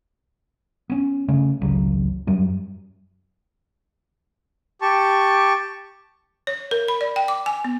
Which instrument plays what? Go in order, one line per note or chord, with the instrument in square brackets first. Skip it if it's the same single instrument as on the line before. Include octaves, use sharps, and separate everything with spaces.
[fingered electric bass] B3 C#4
C#3 A3 C#4
G#1 C#2 C#3 F#3
F#2 F#3 G3
[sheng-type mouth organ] G4 A5 C#6
[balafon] C#5
A#4
B5
D5
G5
D6
G#5
B3